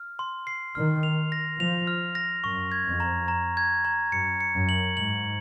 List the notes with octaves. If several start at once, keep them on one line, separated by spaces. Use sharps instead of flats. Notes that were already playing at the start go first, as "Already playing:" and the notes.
Already playing: F6
C6
C7
D#3 F6
F7
A#6
F3 F7
F6
A#6
F#2 C#6
G#6
F2
A#5
A#5
G#6
A#5
F#2 C#7
C#7
F#2
F#7
G#2 F#7